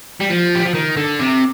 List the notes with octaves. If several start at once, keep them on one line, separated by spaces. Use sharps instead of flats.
G3
F3
G3
F3
D#3
D3
C3